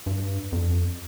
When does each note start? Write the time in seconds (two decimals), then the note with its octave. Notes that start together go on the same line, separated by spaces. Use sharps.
0.06 G2
0.52 F2